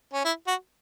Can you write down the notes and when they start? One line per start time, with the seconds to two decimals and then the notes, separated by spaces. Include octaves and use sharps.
0.13 C#4
0.25 E4
0.47 F#4